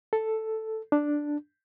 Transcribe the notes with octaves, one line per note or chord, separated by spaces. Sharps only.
A4
D4